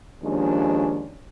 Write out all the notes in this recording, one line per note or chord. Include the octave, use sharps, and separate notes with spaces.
D#2 F3 G#3 C#4 D4